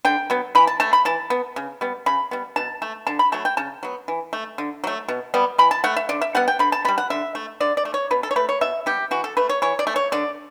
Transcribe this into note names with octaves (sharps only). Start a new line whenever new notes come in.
D3 G5
F#3 B3
E3 B5
A5
A3 A5
B5
E3 A5
B3
C#3
G3 B3
C#3 B5
G3 B3
B2 A5
A3 A5
D3 A5
B5
F#3 A3 A5
G5
C#3 A5
F#3 B3
E3
A3
D3
F#3 A3
B2
G3 B3
E3 B5
A5
A3 F#5
E5
D3 D5
E5
G3 B3 F#5
G5
D3 B5
A5
G3 B3 B5
F#5
D3 E5
A3
D3 D5
D5
A3
C#5
B2 B4
A4
C#5
A3 B4
C#5
B2 E5
G3 B3 G4
E3 F#4
A4
A3 B4
C#5
E3 C#5
D5
A3
C#5
D3 D5